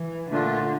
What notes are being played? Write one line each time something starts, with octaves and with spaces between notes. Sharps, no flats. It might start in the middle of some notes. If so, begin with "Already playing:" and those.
Already playing: E3
A#2 D3 A3 D4 F4